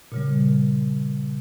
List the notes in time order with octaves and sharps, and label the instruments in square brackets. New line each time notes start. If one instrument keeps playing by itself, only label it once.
[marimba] A#2 C#3 G3